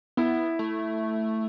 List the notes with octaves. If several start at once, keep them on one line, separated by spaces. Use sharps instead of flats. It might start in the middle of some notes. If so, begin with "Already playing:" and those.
B3 E4
A3